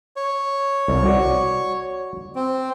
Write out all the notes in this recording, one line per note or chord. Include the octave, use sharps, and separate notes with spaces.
C#5
C2
F#4 D5
C4